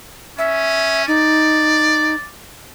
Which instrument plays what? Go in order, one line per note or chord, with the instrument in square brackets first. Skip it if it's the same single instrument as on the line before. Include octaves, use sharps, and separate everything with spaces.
[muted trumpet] C#4 [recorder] E5
[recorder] D#4 [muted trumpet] D5